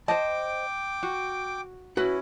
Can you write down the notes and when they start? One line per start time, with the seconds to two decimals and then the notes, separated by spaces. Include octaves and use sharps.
0.08 C5 D#5 G5 A5 D6
1.03 F#4
1.97 C#4 E4 F#4 B4